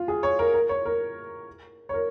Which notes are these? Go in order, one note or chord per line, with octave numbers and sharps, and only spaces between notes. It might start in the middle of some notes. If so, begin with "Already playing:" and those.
Already playing: F4
G#4
C#5
A#4
A#4
C#5
A#4
C#5
A#4